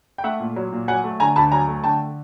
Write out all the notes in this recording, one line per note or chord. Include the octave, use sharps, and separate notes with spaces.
G5
A3 E5 F#5
A#2
F#3
A#2
F#3 F#5 G#5
A3
D3 G#5 A#5
D2 A5 B5
F#3 G#5 A#5
A3
D3 G5 A5